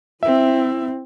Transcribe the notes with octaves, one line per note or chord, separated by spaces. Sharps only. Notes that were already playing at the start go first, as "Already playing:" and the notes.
C4 E4 E5